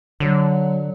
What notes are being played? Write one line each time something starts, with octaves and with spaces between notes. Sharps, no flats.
D3 F#3